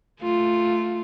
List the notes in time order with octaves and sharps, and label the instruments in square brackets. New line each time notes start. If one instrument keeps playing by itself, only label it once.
[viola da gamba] A3 F4